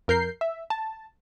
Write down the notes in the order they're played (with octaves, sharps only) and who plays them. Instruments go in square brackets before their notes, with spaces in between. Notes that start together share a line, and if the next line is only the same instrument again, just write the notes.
[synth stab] F2 A#4 G6 C7
E5
A5